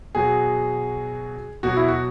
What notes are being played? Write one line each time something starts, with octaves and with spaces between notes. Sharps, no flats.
B2 F#3 G#4
B2 F#3 F#4
E4
F#4